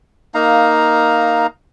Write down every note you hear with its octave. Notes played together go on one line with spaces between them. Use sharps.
A#3 D#4 F5 A#5